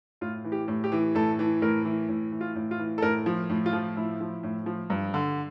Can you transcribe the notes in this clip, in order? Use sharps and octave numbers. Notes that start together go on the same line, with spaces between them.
A2 F4
E3
G4
A2
G4
E3
A2 A4
E3
A2 A#4
E3
A2
E3
F4
A2
F4
E3
A4
A2 A#4
F3
A2
F4
F3
A2 E4
F3
A2
F3
G2
D3